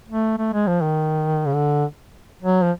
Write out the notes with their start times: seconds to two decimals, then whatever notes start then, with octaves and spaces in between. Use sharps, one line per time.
0.09 A3
0.38 A3
0.53 G#3
0.67 F3
0.82 D#3
1.47 C#3
1.54 D3
2.42 F#3
2.63 F3